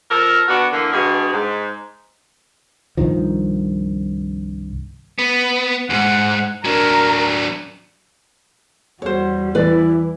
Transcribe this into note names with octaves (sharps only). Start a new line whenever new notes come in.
F3 A4 A#4
B3 D4 F#4
D3 E3 A#3
G2 B2 G4 G#4
G#2
C2 G2 D#3 F3
B3
D2 G#2 F#5
F#3 D4 A#4
E2 G3 F#4 C5 C#5
E3 E4 B4 D5